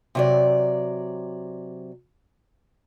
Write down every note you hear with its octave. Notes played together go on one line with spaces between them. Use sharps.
C3 F#3 D5